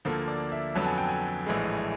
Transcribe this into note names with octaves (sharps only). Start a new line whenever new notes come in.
D2 D3 F3 A#3 A4
D5
E5
F2 D3 F#3 B3 A5
G#5
G5
G#5
A#1 A2 E3 G#3